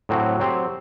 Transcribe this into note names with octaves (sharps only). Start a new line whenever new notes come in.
A2 F#3 C4 F#4
F#3 C4 G4 C5